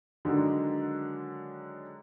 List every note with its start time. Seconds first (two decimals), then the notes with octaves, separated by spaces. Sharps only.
0.25 D3 D#3 F#3 G#3 D4 D#4